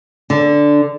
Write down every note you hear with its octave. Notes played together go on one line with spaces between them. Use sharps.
D3